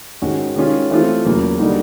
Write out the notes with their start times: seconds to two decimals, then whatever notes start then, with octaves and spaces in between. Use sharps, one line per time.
0.22 G#2 D#3 G#3 C#4 F#4
0.56 D#3 G#3 C#4 F4
0.90 E3 A3 C4 F4
1.24 E2 C#3 F#3 A#3
1.59 D3 G3 A#3 D#4 F#4